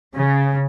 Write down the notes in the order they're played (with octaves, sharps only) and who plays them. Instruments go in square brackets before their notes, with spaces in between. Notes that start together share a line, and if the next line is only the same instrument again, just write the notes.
[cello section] C#3